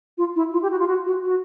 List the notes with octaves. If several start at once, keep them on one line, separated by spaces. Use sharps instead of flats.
F4
E4
F4
G4
F#4
F4
F#4
F#4
F#4